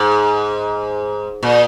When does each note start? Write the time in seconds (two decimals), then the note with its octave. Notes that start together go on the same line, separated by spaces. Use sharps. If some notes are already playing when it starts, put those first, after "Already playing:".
Already playing: G#2
1.43 A#2